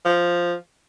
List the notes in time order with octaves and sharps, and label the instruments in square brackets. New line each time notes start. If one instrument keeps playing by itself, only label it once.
[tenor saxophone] F3